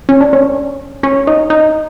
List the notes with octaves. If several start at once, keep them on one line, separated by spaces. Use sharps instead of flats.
C#4
D4
C#4
C#4
D#4
D#4